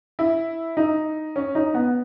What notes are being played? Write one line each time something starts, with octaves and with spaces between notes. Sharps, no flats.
E4
D#4
C#4
D#4
B3